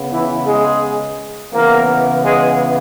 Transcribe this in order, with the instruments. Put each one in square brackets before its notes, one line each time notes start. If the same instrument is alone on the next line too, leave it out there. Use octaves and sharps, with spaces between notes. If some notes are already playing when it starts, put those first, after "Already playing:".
Already playing: [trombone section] C#3 B3
E3 E4
G#3 G#4
C#3 E3 A#3 B3 A#4
G#3 G#4